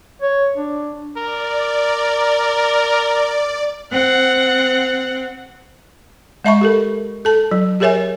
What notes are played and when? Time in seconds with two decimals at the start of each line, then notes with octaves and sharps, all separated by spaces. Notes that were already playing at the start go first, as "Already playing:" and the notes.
0.22 C#5
0.56 D4
1.17 A#4 D5
3.91 C4 F#5
6.44 G#3 D#5 E5 A5 B5 C#6
6.61 G4 A4 A#4
7.25 A4 A5
7.51 F#3
7.80 G4 G#4 A#4 C#5 E5 G#5